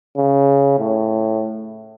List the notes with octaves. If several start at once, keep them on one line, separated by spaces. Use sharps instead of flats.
C#3
A2